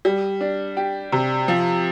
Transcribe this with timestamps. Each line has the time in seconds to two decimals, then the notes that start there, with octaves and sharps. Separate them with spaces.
0.05 G3
0.41 D4
0.77 G4
1.12 C3
1.48 F3